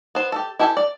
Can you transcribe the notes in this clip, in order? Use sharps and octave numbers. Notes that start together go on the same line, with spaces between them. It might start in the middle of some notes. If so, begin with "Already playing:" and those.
B3 C5
G4 A4
E4 G4 A4 G5 G#5
D5